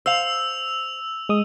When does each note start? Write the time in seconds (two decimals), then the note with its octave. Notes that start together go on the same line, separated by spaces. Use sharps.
0.06 C5 F5 E6 F7
1.29 G#3 D#6